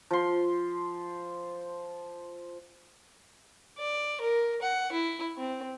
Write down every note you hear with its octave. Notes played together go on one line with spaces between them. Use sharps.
F3 C6
D5
A#4
F#5
E4
C4